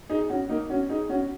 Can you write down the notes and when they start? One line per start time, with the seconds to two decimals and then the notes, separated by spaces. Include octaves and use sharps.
0.09 D#4 G#4
0.30 C#4 F#4
0.49 A#3 D#4
0.70 C#4 F#4
0.89 D#4 G#4
1.09 C#4 F#4